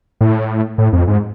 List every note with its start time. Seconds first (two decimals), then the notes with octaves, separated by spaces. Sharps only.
0.21 A2
0.78 A2
0.93 F2
1.07 G#2